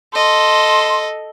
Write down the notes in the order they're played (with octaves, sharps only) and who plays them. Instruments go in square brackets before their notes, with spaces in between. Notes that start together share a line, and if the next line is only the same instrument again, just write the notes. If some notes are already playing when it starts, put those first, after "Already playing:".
[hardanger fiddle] A4 D#5 [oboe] C6